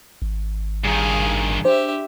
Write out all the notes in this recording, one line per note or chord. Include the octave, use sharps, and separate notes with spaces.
G#1
G2 D#3 G#4 F5
D4 G4 C5 E5